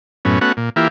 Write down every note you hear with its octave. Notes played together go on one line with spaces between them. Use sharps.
F#2 A2 B3 C#4
A3 B3 C#4 F#4 F#5
A#2
E3 A#3 E4 F4 G4